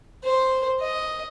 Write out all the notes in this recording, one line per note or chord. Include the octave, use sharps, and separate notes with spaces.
C5
D#5